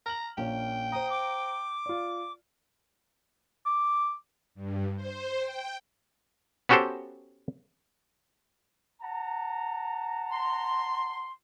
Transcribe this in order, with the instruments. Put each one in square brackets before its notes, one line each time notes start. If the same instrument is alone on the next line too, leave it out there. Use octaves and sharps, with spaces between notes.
[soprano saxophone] A#5 [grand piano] F6 F#7
[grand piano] A#1 A#3 C#4 [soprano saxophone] G5
[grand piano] C5 A#5 [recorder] D#6
[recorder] D6
[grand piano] F4 D5
[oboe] D6
[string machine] G2
C5
G5
[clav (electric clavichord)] B3 C#4 F#4 G4 A4 C5
[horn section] F#5 A5 A#5
[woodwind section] C6